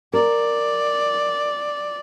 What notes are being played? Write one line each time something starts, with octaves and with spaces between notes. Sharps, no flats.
A#4 D5